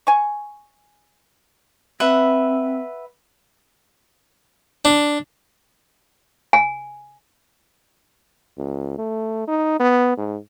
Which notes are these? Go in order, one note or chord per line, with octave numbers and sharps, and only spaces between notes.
G#5 C#6
C4 B4 E5 F#5
D4
G#5
C#2
A3
D#4
B3
G#2